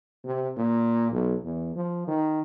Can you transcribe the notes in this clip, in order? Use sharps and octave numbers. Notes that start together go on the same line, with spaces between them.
C3
A#2
B1
E2
F3
D#3